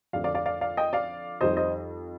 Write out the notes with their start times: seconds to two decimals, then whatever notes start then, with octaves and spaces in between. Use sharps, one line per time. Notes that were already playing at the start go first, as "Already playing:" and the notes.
0.13 F2 D5 F5
0.16 D3 A3
0.24 D5 F5
0.35 D5 F5
0.46 D5 F5
0.61 D5 F5
0.77 D#5 G5
0.93 D5 F5
1.41 F2 D#3 G3 C5 D#5
1.57 C5 D#5